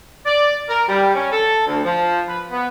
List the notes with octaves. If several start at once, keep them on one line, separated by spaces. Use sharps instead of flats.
D5
A#4
G3
C#4
A4
D2
F3
B4
B3